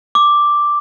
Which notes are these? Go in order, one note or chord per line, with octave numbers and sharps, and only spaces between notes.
D6